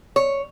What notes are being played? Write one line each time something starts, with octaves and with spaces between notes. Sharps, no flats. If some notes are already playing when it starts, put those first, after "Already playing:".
C#5